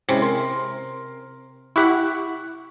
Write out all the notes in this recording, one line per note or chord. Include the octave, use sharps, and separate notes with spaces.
C3 G#3 C#4 E4
A#4 C6
E4 G4 F#5 C#6 F#6 B6